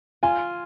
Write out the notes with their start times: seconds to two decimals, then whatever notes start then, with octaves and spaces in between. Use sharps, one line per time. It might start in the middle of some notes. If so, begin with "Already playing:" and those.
0.23 F4 G#5